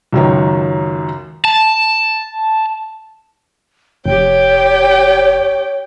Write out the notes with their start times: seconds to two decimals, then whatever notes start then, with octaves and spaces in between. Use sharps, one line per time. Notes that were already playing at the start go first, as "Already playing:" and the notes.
0.13 C#2 F#2 D#3 C#5
1.45 A5
4.06 F1 G4 C#5 G5